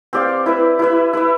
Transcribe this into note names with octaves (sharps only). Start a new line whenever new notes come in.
C4 G4 D5 F5
E4 B4 E5
E4 B4 E5
E4 B4 E5